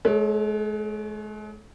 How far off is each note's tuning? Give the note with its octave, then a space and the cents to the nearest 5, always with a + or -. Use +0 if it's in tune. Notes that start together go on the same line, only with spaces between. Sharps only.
G#3 +40 A4 +0 C#5 +0